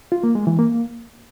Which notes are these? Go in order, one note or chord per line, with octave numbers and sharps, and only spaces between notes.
F4
A#3
G#3
E3
A#3